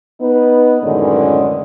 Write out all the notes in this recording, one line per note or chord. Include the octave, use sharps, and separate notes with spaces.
B3 D#4 B4
F#2 A2 D3 D#3 G#3 C#4